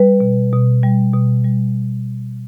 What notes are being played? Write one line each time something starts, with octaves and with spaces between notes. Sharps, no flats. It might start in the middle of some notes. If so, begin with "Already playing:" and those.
Already playing: G3 B4
B2
B2
G3
B2
G3